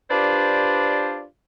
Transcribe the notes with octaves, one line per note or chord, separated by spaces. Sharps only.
D4 F4 G4 B4 C5 D5